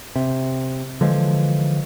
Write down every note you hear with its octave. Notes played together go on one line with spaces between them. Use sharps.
C3
D3 E3 F3 G#3